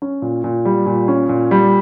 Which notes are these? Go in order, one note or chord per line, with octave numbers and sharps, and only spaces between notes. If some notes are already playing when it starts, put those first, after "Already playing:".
C#4
A#2
A#2
G3
A#2
C#4
A#2
G3